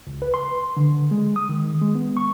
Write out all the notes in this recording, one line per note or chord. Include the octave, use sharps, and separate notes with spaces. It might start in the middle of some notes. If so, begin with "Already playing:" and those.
C#2
B4
C6
D3
G#3
D#6
D#3
G#3
B3
C#6